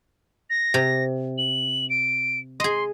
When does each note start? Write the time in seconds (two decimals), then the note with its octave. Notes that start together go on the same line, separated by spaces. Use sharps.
0.50 A#6
0.74 C3
1.38 F#7
1.90 D7
2.60 G#4 D#5 C6